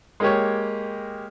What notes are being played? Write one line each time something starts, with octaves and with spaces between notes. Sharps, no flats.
G#3 A#3 G4 C#5